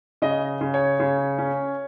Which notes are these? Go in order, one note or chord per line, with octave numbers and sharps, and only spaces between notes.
C#3 D#5
C#3
C#5
C#3
C#4